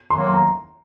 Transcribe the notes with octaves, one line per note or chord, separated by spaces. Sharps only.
D#3 F#3 A#3 C6
C6
A#5